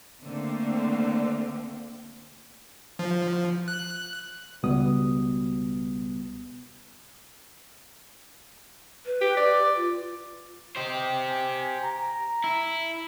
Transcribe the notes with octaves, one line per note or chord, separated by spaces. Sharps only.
D3 A3 A#3 C4
F3
F#6
C#2 B2 G3 B3 D#6
B4
G4
D5
F4
G4 C5 D#5
G#5
A#5
E4